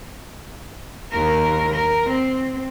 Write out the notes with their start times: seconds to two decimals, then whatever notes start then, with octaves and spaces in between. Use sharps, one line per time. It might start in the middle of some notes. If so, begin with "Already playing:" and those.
1.12 D#2 A#4
1.75 A#4
2.10 C4